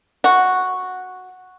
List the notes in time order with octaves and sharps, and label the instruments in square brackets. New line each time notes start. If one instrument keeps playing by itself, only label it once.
[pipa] F#4